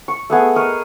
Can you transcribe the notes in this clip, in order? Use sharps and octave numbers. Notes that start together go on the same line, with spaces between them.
C#6
A3 B3 G#4
A#4 D#5 C#6